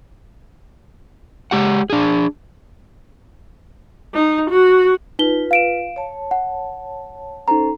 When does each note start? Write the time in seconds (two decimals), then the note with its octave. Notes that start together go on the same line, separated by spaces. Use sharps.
1.51 G#3 G4 F#5
1.90 D4 G#4
4.14 D#4
4.50 F#4
5.19 D#4 F4 B4 G7
5.51 F5 D7 E7
5.96 C#5 A5
6.31 F#5
7.48 C#4 D#4 A4 C5 A#5